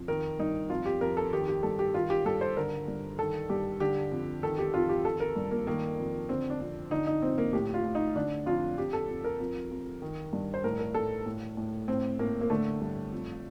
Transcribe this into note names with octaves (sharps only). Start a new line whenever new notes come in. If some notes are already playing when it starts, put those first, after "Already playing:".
Already playing: F2
D#3 A#4
G2 D#4
F2 F4
G4
F2 A#4
A4
D#3 G4
G4
G2 A4
G4
D#3 F4
G4
G2 A4
C5
D3 A#4
G2
D#3 A4
G2 G4
D3 G4
F2
D#3 A4
G4
F2 F4
G4
D#3 A4
A#4
G2
A#3
D#3 A#3
F2
D3 C4
D4
F2
D3 D#4
D#4
F2 C4
A#3
A2 G4
F4
A2
D#4
D3 D4
F2 F4
F2 G4
A4
F2
A#4
F2
F2
D#3
G2
C5
A2 A#4
A#4
A2 A4
A2
A2
A2 C4
A2 A#3
A#3
D3 A3
G2
F2